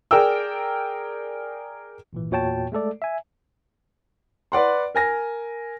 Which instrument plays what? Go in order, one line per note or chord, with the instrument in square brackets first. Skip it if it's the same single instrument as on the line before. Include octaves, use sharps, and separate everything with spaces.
[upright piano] G#4 A#4 D5 G5 E6
[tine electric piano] G#1 A#2 E3
E2 A#2 F#4 C#5 G5 A5
G#3 A3 A4 D5
E5 G#5
[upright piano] B4 D5 F#5 C6
A#4 G#5 A#6